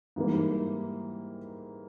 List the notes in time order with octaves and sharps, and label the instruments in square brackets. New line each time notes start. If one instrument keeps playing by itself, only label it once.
[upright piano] G#2 E3 G3 A#3